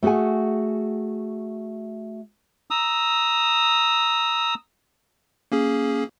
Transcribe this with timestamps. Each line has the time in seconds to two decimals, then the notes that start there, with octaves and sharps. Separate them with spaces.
0.03 A3 F#4 G#4 F#5 G#5
2.71 A#5 D#6 E6
5.52 A#3 C#4 G#4